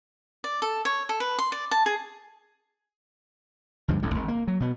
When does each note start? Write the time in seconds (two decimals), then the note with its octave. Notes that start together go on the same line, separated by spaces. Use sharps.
0.44 D5
0.62 A4
0.85 C#5
1.09 A4
1.20 B4
1.39 C6
1.52 D5
1.71 A5
1.86 G#4
3.88 D2 G2 F3 G#3
4.02 E1 C2 A2 D3
4.14 G#1 D#3
4.28 A#3
4.48 F#3
4.60 B2 B3